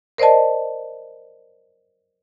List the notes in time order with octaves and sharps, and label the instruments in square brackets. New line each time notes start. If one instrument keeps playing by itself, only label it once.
[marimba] A#4 C5 D5 D#5 A5